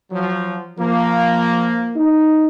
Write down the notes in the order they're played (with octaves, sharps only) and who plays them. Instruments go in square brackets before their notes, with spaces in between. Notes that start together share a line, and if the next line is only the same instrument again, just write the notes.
[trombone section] F3 F#3
[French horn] F3 [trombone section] A#3
[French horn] D#4